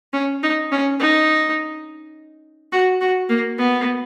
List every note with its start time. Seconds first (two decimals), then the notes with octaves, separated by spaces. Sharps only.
0.13 C#4
0.43 D#4
0.72 C#4
1.00 D#4
2.73 F#4
3.01 F#4
3.29 A#3
3.58 B3